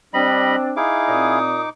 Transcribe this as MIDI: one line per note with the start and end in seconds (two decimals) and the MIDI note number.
0.14 0.56 55
0.14 0.76 60
0.14 0.76 62
0.14 0.56 75
0.14 0.56 83
0.77 1.69 63
0.77 1.39 64
0.77 1.39 68
0.77 1.39 77
0.77 1.69 86
1.08 1.61 46
1.08 1.61 60
1.08 1.61 87